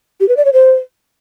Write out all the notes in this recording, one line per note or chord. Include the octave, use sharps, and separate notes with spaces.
G4
B4
D5
C#5
C5